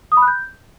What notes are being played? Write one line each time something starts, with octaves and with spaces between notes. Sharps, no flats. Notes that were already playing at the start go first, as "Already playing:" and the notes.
D#6
B5
F#6
G6